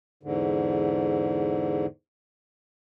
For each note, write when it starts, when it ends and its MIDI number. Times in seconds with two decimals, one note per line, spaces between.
0.23 1.86 40
0.23 1.86 44
0.23 1.86 50